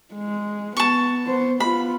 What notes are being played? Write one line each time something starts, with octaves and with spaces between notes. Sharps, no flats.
G#3
B3 A5 C#6
B3 C5
B3 F4 B5